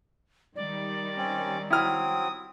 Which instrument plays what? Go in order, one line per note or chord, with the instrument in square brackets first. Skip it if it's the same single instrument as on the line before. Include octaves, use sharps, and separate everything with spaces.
[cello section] D#3 G3 [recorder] D5
[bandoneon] C4 C#4
[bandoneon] F#3 C4 [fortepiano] E4 F6 [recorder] D#6